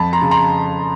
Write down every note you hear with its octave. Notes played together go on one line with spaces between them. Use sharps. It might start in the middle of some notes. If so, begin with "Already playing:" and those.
Already playing: F2 A5 B5
A#5 C6
C#3
A#5 C6